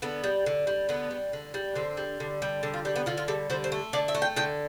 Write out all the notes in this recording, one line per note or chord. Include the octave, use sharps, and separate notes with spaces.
D3 B3
G3
D3
G3
D3 B3
G3
D3
G3
D3 C4
G3
D3
G3
D3 D4
F4
G3 G4
B3
D3 F4
F4
G3 A4
D3 C5
C5
A3
D3 D5
E5
A3
G5
D3 G5